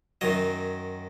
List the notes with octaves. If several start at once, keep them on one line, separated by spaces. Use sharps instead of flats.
F#2 D#3 F#3 D#5